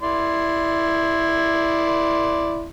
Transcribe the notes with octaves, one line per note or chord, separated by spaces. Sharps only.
E4 D5 C6